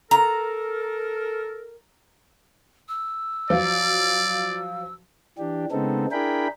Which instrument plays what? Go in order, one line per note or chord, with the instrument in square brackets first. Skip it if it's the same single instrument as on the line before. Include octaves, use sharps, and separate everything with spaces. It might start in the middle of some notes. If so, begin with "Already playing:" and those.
[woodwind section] A4 A#4 [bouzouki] A#5
[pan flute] E6
[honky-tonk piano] F3 F#3 F4 [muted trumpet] D5
[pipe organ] E3 D4 G4
C#3 G#3 B3 C4 D#4 A4
D4 E4 G#4 A#4 G5 B5